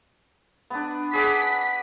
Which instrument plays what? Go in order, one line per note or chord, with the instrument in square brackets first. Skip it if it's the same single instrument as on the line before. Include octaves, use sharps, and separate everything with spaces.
[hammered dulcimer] B3 D4
[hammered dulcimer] G#4 D5 F#5 [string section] B6